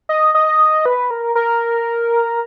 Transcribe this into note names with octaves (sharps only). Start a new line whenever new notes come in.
D#5
D#5
B4
A#4
A#4